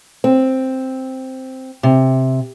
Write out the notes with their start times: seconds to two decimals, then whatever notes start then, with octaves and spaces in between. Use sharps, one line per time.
0.24 C4
1.83 C3